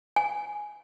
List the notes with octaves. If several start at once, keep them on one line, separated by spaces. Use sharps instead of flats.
G#5